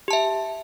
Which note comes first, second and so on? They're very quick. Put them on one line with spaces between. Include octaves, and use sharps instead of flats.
G4 A5 E5